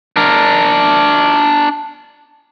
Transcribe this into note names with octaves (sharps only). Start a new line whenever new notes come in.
D4 A#4